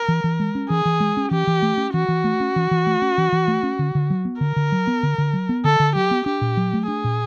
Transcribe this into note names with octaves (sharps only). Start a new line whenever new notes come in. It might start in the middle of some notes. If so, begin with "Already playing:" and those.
Already playing: A#4
E3
E3
G#3
C#4
E3 G#4
E3
G#3
C#4
E3 G4
E3
A3
C#4
E3 F#4
E3
A3
C#4
E3
E3
A3
C#4
E3
E3
A3
C#4
D3
D3
F#3
B3
D3 A#4
D3
F#3
B3
D3
D3
F#3
B3
D3 A4
D3
F#3 G4
B3
D4 G4
A#2
F#3
A3
D4 G#4
A#2